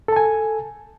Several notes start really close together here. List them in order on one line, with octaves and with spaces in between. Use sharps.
A4 A5 G#5